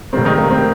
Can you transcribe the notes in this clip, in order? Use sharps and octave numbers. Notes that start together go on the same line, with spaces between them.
F1 D#2 D#3 C4
D#3 D#4
A#3
C4